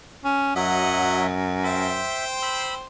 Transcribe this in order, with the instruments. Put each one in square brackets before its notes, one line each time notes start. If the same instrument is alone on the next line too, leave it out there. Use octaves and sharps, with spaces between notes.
[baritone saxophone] C#4
[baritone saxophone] F#2 [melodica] F#3 E5 [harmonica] D#5 F#5 D#6
[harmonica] C5 G5 C6 [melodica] E5
[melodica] B5 E6